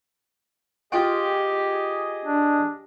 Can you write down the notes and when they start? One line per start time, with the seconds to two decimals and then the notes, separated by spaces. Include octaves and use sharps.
0.92 F4 G4 G#4 D#5 G5
2.25 D4